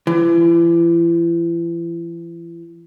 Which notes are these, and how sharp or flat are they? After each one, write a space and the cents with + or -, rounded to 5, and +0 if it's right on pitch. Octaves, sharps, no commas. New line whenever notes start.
E3 +40